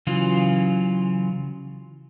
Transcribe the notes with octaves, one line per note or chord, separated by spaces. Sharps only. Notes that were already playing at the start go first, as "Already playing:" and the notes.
C#3 E3 F#3 F4